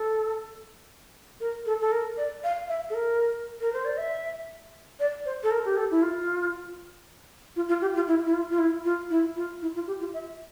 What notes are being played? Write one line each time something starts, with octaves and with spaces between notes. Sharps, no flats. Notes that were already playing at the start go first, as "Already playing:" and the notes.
Already playing: A4
A#4
A4
A4
A#4
D5
F5
E5
A4
A#4
A#4
C5
D5
E5
D5
C5
A4
A#4
G4
A4
E4
F4
F4
F4
G4
F4
E4
E4
F4
F4
E4
F4
E4
F4
E4
F4
G4
F4
E5